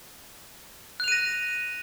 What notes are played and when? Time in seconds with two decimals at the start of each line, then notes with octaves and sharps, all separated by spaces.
1.00 F#6
1.04 F7
1.08 D#7
1.12 A#6